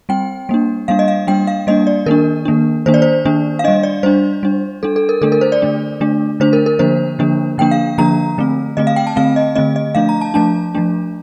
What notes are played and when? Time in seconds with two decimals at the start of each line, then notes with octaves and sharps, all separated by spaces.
0.09 G3 C4 G5
0.49 G3 A#3 D4
0.88 G3 A#3 D4 F5
0.99 D#5
1.08 F5
1.27 G3 A#3 D4 G5
1.47 F5
1.67 G3 A#3 D4 D#5
1.87 D5
2.06 D#3 A#3 D4 A#4
2.45 D#3 A#3 D4
2.86 D#3 A#3 D4 C5
2.94 D5
3.02 C5
3.25 D#3 A#3 D4
3.59 F5
3.64 D4 D#5
3.68 G3
3.83 D5
4.03 G3 D4 C5
4.43 G3 D4
4.83 G3 D4 A4
4.96 A4
5.09 A#4
5.21 D3 A3 D4 A4
5.32 A#4
5.41 C5
5.52 D5
5.62 D3 A3 D4
6.00 D3 A3 D4
6.40 D3 A3 D4 C5
6.53 A#4
6.66 A#4
6.79 D3 F3 A#3 D4 C5
7.19 D3 F3 A#3 D4
7.58 D3 F3 A#3 D4 G5
7.71 F5
7.98 D3 F3 A#3 D4 A#5
8.38 D3 A3 C4
8.77 D3 A3 C4 D#5
8.87 F5
8.96 G5
9.07 A5
9.16 D3 A3 C4 F5
9.36 D#5
9.55 D3 A3 C4 D#5
9.76 D#5
9.95 F3 A3 D4 F5
10.09 A#5
10.21 A5
10.34 F3 A3 D4 A5
10.75 F3 A3 D4